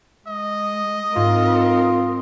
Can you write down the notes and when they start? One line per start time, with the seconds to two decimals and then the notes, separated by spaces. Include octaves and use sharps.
0.27 G#3 D#5
1.16 G#2 C4 F4 A#4